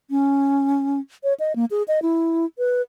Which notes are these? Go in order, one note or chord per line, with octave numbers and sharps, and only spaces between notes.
C#4
C#5
D#5
A#3
G#4
D#5
E4
B4